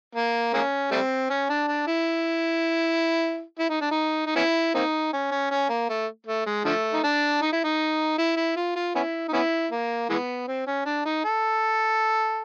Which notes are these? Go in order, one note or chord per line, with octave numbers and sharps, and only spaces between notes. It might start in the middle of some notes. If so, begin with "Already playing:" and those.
A#3
G#3 A#3 C#4
G3 A3 C4
C#4
D4
D4
E4
E4
D#4
D4
D#4
D#4
B3 C#4 E4
A#3 C4 D#4
C#4
C#4
C#4
A#3
A3
A3
G#3
D3 F3 A3
D#4
D4
D#4
E4
D#4
E4
E4
F4
F4
B3 C#4 E4
D#4
B3 C#4 E4
A#3
E3 G#3 B3
C4
C#4
D4
D#4
A4